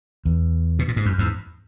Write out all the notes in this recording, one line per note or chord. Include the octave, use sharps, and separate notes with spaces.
E2
B2
A#2
G#2
F#2
E2 G#2